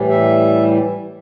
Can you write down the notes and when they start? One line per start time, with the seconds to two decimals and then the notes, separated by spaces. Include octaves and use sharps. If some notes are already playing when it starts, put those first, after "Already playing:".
Already playing: A2 E3 G3
0.10 E5